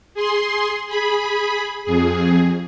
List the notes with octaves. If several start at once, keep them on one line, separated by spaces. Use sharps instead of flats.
G#4 C6
G#4 B5
F2 G#4